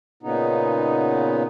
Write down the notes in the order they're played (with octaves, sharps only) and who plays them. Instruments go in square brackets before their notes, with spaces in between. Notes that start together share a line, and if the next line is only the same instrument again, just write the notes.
[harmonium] A#2 C#3 B3 D#4